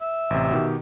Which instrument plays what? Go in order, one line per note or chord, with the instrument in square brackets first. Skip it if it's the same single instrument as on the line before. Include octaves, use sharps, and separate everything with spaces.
[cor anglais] E5
[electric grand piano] A1 C3
B2 D#3 G4